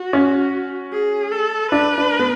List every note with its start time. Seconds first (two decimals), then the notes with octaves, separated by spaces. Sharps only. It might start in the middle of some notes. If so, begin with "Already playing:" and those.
Already playing: F#4
0.13 C#4
0.92 G#4
1.32 A4
1.72 D4 B4
1.98 D4
2.19 B3